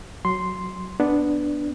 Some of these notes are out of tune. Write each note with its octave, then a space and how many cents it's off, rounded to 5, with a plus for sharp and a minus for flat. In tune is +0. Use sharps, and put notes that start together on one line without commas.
F#3 +0 C6 +0
B3 +0 D4 +0